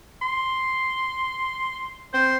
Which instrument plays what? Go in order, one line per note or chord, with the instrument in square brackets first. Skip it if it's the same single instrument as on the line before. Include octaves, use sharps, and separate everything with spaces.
[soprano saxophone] C6
[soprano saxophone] C4 [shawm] C5